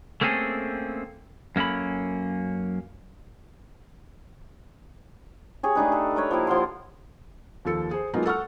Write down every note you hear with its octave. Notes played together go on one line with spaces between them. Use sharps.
A3 A#3 C4 C#4 G#4 A4
F#2 A#3 C#4 A4 B5
G4 G#4 C#5
A3 D4 D#4 B4
A4
G4 A#4 B4 C#5
F3 A#3 E4 G4
F3 F#5 C6
D#2 F3 A4 C#7
G#4 C5
F#3 G#3 A#3 B3 D#4 F4
A4 F#5 C#6 F6